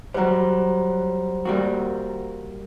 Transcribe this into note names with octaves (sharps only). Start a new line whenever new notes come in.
F#3 G3 C5 F#5 A#5
G3 A#3 F#4